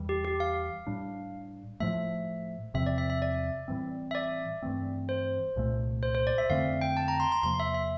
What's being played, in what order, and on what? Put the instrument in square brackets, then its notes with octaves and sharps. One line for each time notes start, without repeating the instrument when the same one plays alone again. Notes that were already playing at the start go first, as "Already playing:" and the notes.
Already playing: [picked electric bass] E2 E3 G3
[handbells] G4
G4
F5
[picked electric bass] A2 G3 D4
[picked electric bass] A2 F3 A3 [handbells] E5
[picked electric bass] E2 C3 F3 C4 [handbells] E5
[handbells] D5
E5
E5
D5
[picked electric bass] A2 E3 G3 C4
[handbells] E5
D5
[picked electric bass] G2 E3 A3 C4
[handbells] C5
[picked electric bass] C2 A#2 A3
[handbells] C5
C5
D5
E5
[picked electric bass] F2 D3 A3 C4 [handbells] F5
[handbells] G5
A5
A#5
C6
C6
[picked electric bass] E2 C3 F3 A#3 [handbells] C6
[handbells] E5
E5